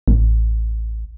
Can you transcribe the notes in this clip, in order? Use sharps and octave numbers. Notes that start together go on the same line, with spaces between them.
A1